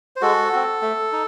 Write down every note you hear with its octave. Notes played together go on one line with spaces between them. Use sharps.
C5
G#3 F#4 A4
C4 F#4
A3
D#4